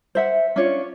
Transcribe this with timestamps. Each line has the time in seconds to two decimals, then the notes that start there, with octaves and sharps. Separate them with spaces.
0.15 C5 E5 F#5
0.56 C#4 D4 F4 C#5